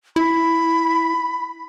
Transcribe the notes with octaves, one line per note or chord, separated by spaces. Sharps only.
E4 B5